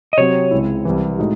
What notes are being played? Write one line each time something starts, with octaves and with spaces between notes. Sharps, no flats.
D#5
C3 F#3 C4 C#5
C#2 C#3 G#3 C4 E4
C2 C3 E3
A2 G#3 D#4 F#4